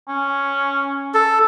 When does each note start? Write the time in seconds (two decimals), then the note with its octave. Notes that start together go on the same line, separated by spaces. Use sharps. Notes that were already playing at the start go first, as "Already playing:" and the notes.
0.08 C#4
1.14 A4